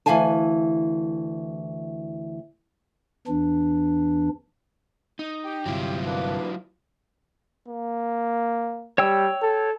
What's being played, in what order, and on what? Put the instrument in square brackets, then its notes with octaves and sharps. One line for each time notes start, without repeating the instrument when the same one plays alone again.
[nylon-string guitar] D2 E3 E4 F5 G#5 A5
[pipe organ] E2 E3 D4
[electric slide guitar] D#4
[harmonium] G4 G5
[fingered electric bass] G1 C2 [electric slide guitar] F#3 E4 F4
[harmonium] A#3 D4 B4
[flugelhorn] A#3
[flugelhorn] G3 [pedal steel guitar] C#5 G5 E6
[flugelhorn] A4